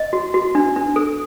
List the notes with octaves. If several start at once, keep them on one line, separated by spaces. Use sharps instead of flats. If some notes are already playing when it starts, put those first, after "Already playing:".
Already playing: D#5
F#4
F#4
D4
D4
A4